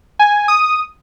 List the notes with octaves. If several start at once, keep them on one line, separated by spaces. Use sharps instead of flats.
G#5
D#6